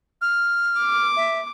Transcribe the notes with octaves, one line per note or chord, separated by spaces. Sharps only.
F6
D6
E5